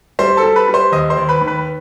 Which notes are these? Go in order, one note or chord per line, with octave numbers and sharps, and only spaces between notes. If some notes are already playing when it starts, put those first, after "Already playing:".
G3 C5 C6
A4 A5
G3
B4 B5
G3
C5 C6
D#2 D#5 D#6
C5 C6
D#2
B4 B5
D#3
B4 B5